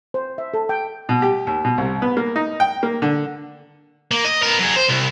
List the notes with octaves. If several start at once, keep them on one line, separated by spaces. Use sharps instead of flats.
C5
E5
A4
G5
B2
G4
D#2
B2
C2
B3
A#3
D#4
G5
A#3
D3
A#3
D#5
B3 A#4
F#3 G#4
C5
C2